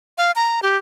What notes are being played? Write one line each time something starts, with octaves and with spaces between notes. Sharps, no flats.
F5
A#5
G4